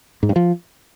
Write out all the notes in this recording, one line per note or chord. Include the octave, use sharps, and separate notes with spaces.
G#2
G2
F3